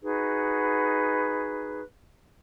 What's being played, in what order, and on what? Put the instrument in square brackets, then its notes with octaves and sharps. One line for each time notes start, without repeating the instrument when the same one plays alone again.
[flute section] D#4 F#4 G#4 B4